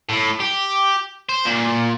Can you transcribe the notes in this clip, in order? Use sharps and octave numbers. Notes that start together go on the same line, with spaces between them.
A2
G4
C5
A#2